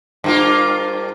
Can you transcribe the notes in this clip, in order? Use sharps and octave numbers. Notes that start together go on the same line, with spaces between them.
G2 A#3 F4